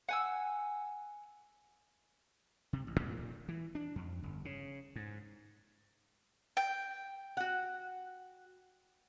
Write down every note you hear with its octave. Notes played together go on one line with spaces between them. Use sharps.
F#5 G#5 E6
C3
A1
A#2
E3
D4
F2
G1
C#3
G#2
G5
F#4 F#5